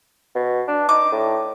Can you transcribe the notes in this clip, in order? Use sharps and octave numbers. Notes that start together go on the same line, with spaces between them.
B2
D4
D#4 D6
A2